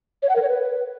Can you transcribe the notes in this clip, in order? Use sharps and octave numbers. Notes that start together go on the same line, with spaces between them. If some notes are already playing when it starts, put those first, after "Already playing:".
C#5
F#5
A#4
C#5
B4